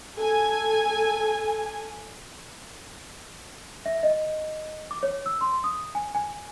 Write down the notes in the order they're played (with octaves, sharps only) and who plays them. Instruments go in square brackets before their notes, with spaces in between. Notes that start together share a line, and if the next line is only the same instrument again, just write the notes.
[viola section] A4 G#5
[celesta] E5
D#5
D6
C#5
E6
C6
D#6
G#5
G#5